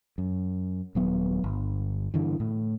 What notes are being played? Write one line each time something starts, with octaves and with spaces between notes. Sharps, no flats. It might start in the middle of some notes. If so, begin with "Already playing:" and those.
F#2
D#1 F#3 B3
G1
G2 D3 E3
A2